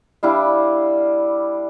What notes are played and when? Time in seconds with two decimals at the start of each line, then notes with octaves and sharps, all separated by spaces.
0.23 G3 D4 E4 F5